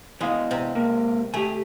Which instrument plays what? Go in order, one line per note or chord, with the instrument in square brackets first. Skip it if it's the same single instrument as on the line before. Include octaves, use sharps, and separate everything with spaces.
[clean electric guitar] E2 B2 F5 [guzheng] G#3
[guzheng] C3
[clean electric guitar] G#3 A#3 A#4
[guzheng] A3 [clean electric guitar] G4 G#5